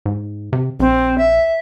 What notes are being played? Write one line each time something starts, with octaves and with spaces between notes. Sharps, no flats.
G#2
C3
A#1 C4
E5